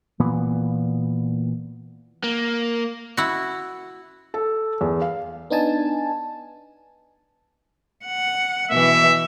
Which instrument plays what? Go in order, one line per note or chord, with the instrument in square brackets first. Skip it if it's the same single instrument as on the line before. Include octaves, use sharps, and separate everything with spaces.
[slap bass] A#2 E3 B3
[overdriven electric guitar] A#3
[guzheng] E4 F#4
[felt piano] A4
E2
F5
[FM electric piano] B3 D4 D#4 G#5 A5
[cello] F#5
[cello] B2 E3 [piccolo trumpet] E5